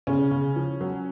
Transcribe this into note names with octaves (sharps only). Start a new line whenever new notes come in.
C#3 C#4
C#3
F3
F#3